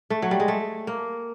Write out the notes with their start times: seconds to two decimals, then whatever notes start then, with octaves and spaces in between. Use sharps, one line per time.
0.10 A3
0.22 F#3
0.31 G3
0.40 G#3
0.48 A3
0.87 A#3